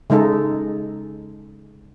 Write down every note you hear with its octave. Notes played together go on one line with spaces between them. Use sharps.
C#3 G#3 D#4 A4